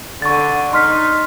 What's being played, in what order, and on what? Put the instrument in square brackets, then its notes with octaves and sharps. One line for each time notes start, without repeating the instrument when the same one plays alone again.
[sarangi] D3 [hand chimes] C#6 A6
[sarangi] D#4 [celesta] C6 F6 B6